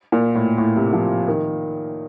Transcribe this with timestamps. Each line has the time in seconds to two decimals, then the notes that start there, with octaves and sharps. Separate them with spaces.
0.12 A#2
0.35 A2
0.58 A2
0.76 C3
0.93 F3
1.28 D#3